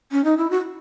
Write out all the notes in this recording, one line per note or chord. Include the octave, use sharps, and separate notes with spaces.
C#4
D#4
E4
F#4